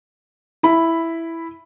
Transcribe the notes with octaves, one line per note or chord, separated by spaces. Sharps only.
E4 B5